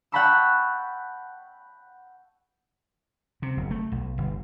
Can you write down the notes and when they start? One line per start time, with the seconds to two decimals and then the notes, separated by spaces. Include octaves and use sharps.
0.12 F#5 G5 A5 B5 C#6 E6
3.42 C3
3.57 F#1
3.71 A3
3.92 B1
4.18 G1